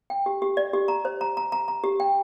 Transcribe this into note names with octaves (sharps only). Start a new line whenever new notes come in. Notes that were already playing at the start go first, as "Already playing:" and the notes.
G5
G4
G4
D5
G4
A#5
C5
A#5
A#5
A#5
A#5
G4
G5